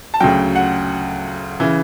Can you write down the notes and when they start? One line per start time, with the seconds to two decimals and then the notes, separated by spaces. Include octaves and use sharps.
0.14 A5
0.20 D2 C#3 F#3 G5
0.56 F#5
1.60 C#3 E3